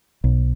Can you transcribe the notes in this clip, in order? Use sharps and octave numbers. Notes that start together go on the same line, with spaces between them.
B1